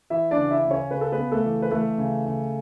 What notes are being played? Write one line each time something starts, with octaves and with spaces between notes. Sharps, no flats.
E3 E4 E5
D4 D5
C#3
E4 E5
C#3
C#4 C#5
C#3 B4
A4
B3 B4
C#3
A3 A4
E3
B4
E3 A3 A4
C#3
C#3